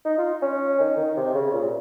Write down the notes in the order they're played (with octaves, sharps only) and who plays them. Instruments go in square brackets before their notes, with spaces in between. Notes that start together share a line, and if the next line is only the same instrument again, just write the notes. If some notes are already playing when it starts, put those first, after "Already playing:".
[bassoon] D#4
F4
C#4
D#3
D#3
C3
C#3
A#2